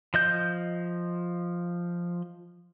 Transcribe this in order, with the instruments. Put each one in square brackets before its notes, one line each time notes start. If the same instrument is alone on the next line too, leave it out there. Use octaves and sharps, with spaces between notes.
[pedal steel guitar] F3 D#5 G6